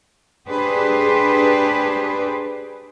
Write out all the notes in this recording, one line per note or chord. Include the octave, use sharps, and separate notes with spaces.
D4 G4 G#4 B4 C5